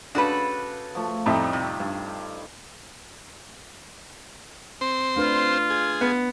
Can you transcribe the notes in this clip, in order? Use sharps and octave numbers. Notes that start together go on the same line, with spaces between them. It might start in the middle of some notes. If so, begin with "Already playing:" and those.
C#3 D4 F#4 A4 B4 B5
F3 A3
F2 A2 G3 A3 D#4 C5
C3
G2
C4 C5
A3 D4 F4 B4
G#4
B3